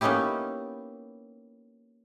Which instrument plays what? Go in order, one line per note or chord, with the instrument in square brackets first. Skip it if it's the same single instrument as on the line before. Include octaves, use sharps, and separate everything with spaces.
[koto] A#3 B3 C#4 D#4 E4 G4